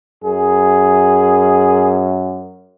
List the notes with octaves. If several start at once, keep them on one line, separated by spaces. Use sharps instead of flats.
F#2 G#4